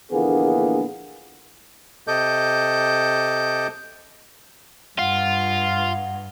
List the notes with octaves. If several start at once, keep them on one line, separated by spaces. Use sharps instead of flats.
A#1 D3 E3 A#3 B3 G#4
C3 A4 D#5 D6 G6
G2 F4 F#5